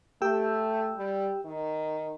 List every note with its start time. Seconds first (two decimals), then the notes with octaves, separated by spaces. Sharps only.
0.22 A3 G4 G5 E6
0.97 G3
1.45 D#3